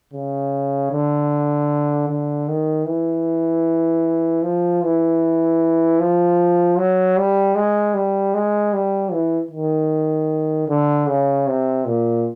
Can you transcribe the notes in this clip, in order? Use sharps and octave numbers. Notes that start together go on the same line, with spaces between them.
C#3
D3
D3
D#3
E3
F3
E3
F3
F#3
G3
G#3
G3
G#3
G3
E3
D#3
D3
C#3
C3
A#2